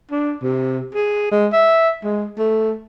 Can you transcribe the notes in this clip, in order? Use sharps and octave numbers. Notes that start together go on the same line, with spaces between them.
D4
C3
G#4
G#3
E5
G#3
A3